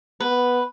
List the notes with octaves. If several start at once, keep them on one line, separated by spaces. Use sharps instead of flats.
B3 B4